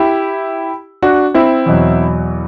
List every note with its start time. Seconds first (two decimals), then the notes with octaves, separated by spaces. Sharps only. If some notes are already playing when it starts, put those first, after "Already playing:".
Already playing: E4 G4
1.02 D4 F#4
1.34 C4 E4
1.66 E2 B2 F#3